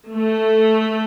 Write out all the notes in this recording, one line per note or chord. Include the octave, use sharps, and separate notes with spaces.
A3